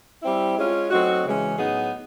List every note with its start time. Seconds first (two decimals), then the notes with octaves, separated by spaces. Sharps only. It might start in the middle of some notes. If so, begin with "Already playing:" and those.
0.22 G3 C4 E4
0.57 G#3 C#4 F4
0.90 F#3 A3 C4 D#4 F#4
1.24 C#3 E3 G#3 C#4
1.58 A2 F#3 B3 D#4 G#4